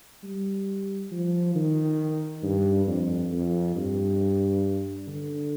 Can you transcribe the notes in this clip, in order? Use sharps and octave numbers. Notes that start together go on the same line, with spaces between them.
G3
F3
D#3
G2
F2
F2
G2
D3